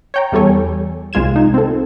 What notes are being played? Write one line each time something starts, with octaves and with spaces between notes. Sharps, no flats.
C#5 G5 A#5
E2 G3 A4 C#5 G#5
C2 G#3 F4 G#6 E7
D#4
C4 A4